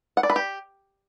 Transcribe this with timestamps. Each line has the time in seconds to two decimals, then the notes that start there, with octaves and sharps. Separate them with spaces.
0.17 F#5
0.23 D5
0.30 B4
0.36 G4